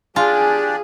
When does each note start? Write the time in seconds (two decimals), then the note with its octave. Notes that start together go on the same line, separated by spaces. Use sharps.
0.16 D4 F4 G4 G#4 D5 G#5